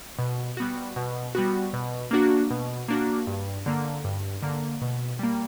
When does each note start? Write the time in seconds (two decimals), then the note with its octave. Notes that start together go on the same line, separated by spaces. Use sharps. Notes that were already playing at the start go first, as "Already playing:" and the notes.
0.19 B2
0.57 G3 B3 F#4
0.96 B2
1.35 G3 B3 F#4
1.73 B2
2.11 A#3 D4 F#4
2.50 B2
2.88 A#3 D4 F#4
3.27 G2
3.66 D3 A#3
4.04 G2
4.43 D3 A#3
4.82 B2
5.19 G3 A#3